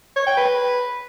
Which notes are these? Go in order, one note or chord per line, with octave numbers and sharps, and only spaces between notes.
C#5
G5
B4